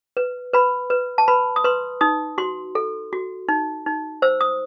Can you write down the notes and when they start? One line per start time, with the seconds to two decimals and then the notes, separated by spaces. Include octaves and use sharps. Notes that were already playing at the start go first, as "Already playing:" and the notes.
0.17 B4
0.54 B4 B5
0.90 B4
1.18 A5
1.28 B4 B5
1.56 D#6
1.64 B4 C6
2.01 D#4 D#6
2.38 F#4 C6
2.75 A4
3.13 F#4
3.49 D#4
3.86 D#4
4.22 C5 E6
4.41 D#6